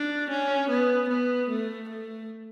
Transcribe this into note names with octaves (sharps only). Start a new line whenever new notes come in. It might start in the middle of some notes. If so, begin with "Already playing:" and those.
Already playing: D4
C#4
B3
B3
A3
A3